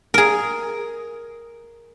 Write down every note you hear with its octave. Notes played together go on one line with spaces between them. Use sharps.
G#4 A#4